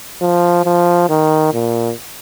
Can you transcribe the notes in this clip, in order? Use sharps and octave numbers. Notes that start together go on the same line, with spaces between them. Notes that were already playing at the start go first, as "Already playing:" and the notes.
F3
F3
D#3
A#2